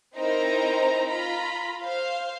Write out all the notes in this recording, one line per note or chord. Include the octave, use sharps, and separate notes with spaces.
C4 D#4 E4 A#4 C5 A#5
F4 A#5 B5
C5 F5